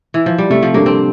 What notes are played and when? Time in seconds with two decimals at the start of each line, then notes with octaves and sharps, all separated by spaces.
0.14 E3
0.26 F3
0.38 G3
0.50 C3 A3
0.63 F3
0.74 G3 A#3 D4 A4
0.86 C4